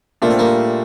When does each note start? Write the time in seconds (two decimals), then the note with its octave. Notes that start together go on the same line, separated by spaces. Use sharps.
0.22 A#2 A3 A#3 D4 F4
0.30 C4
0.39 G3 A#3